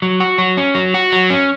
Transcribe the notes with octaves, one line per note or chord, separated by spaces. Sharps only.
F#3
F#4
F#3
C#4
F#3
F#4
F#3
C#4